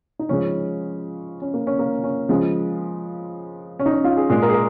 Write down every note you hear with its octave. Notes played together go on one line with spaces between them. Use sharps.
D#4
C#3 F3 G#3 C#4
C#4
A#3
C#4
A#3
C#4
C#3 F3 G#3
C#4
D#4
C#4
F4
G#4
A#2 G#3 G#4
A#4
G#4
A#4